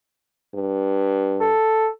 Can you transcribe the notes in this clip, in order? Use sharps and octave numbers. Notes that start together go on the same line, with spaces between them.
G2
A4